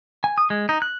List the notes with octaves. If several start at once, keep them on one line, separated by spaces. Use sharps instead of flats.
G#5
D#6
G#3
D#4
F#6